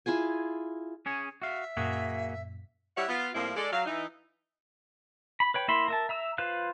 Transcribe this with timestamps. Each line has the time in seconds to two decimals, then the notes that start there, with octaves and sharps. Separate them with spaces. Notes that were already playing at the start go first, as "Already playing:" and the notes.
0.06 E4 F4 G#4 G#5
1.06 C#4 G#4 C#5
1.42 F#4 E5 F5
1.77 F#2 A#2 A#3 F#4 G#4 B6
2.97 G3 E4 C#5 E5 F#5
3.08 B3 F4
3.34 A2 F3 G3 A#3 C4 E4
3.56 G#3 A4 D5
3.72 F#3 F5
3.86 E3 D#4
5.40 B5
5.54 B4 C#5 G5
5.68 A#3 E4 E5 B5 C6
5.88 A#4 E5 A5
6.09 E5 A#5 E6
6.38 F4 B4 C5 F5 F#6